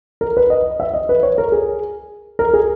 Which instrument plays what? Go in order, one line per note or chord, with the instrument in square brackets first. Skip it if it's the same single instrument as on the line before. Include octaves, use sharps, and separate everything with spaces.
[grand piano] A#4
B4
D#5
E5
D#5
B4
C#5
A#4
G#4
A#4
G#4